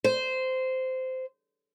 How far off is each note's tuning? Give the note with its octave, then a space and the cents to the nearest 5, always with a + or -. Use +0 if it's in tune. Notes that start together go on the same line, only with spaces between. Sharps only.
C5 -15